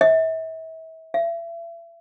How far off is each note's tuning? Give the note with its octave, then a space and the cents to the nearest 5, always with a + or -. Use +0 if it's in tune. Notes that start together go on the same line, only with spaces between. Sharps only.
E5 -35
E5 +35